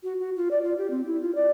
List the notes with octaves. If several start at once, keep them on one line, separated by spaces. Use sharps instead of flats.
F#4
F#4
F4
D5
F4
G4
C4
E4
F4
D5